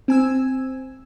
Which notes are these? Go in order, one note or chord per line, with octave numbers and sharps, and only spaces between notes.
C4 G#5 E6